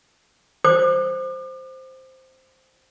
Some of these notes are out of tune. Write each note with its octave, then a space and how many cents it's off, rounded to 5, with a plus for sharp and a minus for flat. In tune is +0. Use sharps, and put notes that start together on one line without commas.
C5 +0 D6 +40